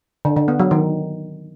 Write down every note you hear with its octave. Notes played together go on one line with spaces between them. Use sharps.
D3
D3
B3
F#3
D#3